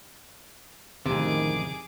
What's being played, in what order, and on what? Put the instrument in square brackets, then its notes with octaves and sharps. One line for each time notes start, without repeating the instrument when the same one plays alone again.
[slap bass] D1 A1 A2 [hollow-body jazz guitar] F2 C3 [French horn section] D#3 [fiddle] G#4 D6